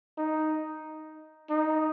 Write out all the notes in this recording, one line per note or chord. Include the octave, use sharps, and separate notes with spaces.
D#4
D#4